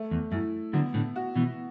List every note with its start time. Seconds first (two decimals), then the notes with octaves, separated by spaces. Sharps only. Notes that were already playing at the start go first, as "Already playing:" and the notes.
Already playing: A3
0.11 E2
0.31 F#2 E4
0.73 D3 F#3 B3
0.94 A2 D3
1.16 F#4
1.36 B2 E3